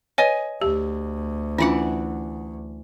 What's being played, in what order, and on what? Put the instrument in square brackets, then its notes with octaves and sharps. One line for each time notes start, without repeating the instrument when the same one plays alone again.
[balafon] B4 C#5 [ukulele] D#5 G#5
[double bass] D2 [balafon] G4
[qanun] E3 D5 F#5 [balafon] C#4 D4 F4